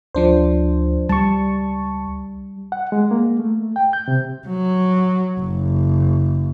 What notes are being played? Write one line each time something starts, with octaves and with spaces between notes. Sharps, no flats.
D2 F3 D4 C5
C#2 G3 A5 C#6
F#5
G#3
A#3
A3
G5
G6
C3
F#3
F#1